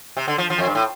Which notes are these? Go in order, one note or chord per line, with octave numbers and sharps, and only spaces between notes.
C3
D3
F3
F3
F2
G2
A2